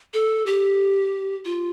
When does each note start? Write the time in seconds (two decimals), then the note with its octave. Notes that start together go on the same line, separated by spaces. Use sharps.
0.14 A4
0.46 G4
1.45 F4